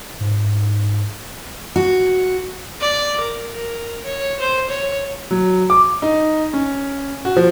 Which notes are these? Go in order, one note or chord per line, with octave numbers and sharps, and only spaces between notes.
G#2
F#4
D5
A#4
A#4
C#5
C5
C#5
F#3
D6
D#4
C#4
F#4
F3